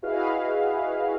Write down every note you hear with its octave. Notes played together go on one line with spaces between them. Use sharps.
E4 F#4 G#4 B4 D#5 F5